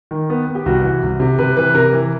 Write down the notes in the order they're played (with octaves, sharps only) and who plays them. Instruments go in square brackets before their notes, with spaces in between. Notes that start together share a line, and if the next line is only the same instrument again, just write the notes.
[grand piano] D#3
B3
B3
G4
C2 F#4
E3
C2
C3
C3 B4
E3 B4
C3 A#4
E3